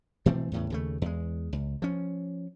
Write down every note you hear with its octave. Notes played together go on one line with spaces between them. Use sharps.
B2 E3 A3 C4
E2 A2 C#3
D#2 C#3 A3
E2 G#3
C#2
F3 C#4